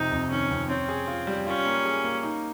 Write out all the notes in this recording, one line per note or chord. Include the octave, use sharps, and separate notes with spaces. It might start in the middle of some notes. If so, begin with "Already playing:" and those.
Already playing: F2 C3 D#4
F2
D#3 C#4
F2
C4 C#4
G#4
F4
G3
C#4 F4
A#3
G#4
A#3
D#4